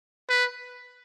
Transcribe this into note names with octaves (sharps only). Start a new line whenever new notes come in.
B4